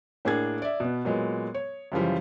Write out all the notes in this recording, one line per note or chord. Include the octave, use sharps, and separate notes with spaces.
A2 A#3 D4 G#4 G#6
D5 E5
B2 B3
A#2 F#3 G#3 B3
C#5
F#2 C#3 E3 F3 G3